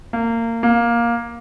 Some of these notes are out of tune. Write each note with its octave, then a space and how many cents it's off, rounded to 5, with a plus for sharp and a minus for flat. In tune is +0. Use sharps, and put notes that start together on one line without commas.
A#3 -25
A#3 +10